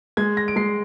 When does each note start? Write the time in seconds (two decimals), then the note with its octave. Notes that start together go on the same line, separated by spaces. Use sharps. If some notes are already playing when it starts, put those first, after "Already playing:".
0.17 G#3 G#6
0.37 A#6
0.48 D7
0.56 G#3 C7